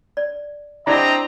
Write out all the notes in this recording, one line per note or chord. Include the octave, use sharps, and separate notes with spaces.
D5
C4 D4 E4 G4 D5 D#5 F#5 A#5